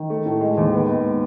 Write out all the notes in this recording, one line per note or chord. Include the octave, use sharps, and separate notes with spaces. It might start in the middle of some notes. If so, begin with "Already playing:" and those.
Already playing: D#3
A3
A2
G#3
D#2
B3
G#2